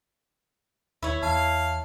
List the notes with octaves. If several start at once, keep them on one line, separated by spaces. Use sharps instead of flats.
D#2 E4 C#5
E2 F5 A5